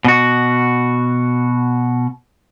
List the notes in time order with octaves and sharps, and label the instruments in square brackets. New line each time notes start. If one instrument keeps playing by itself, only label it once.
[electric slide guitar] B2 F#4